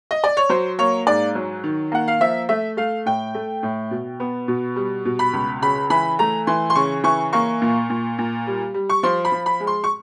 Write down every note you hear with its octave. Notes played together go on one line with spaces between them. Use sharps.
D#5
D5
C#5
F#3 C5
A#3 C#5
G#2 D5
F#3
D#3
A#3 F#5
F5
F3 E5
A3 E5
A3 F5
A2 G5
A3
A2
B2
B3
B2
G3
B2
B5
C#2
C#3 B5
E3 B5
A3 A#5
E3 C6
C6
C#3 C#6
E3 C#6
A#3 C#6
A#2
A#2
A#2
G3
G3
C#6
F3 C6
B5
F3
B5
G#3
C6
C#6